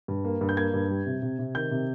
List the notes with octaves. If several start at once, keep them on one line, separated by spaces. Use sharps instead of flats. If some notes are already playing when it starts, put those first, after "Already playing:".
G2
A#3
G2
G6
A#3 G#6
G2
G3
C3
C3
C3
D#3 G6
C3